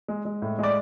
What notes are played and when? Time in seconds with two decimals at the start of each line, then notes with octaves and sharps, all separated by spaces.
0.08 G#3
0.25 G#3
0.42 A2
0.59 G#3 D5